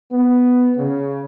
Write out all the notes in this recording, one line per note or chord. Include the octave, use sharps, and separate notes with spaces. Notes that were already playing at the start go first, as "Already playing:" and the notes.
B3
C#3